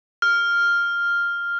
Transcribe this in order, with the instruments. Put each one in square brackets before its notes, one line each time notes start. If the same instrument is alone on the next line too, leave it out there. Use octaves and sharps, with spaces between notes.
[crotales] F6